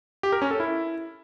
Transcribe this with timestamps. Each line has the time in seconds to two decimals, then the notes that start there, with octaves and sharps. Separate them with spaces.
0.23 G4
0.32 A#4
0.42 C#4
0.51 A4
0.60 E4